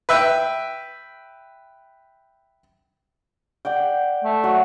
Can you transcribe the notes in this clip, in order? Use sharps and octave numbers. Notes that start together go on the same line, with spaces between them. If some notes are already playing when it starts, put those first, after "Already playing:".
B4 E5 G5
D5 F#5 G5
A3
F#3 F#5